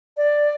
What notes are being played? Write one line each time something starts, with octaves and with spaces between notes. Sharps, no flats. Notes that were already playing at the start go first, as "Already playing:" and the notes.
D5